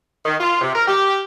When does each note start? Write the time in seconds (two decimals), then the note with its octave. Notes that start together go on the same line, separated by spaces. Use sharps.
0.24 D#3
0.40 F4
0.61 C3
0.74 A#4
0.88 G4